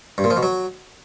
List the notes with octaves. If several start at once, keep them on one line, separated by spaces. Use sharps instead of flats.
G2
A#2
F3
B2
F#3